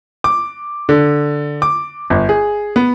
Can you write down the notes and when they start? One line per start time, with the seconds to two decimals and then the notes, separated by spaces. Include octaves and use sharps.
0.24 D6
0.89 D3
1.62 D6
2.10 G1
2.29 G#4
2.76 B3